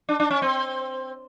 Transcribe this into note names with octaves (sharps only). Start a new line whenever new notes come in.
D4
D4
C#4
C4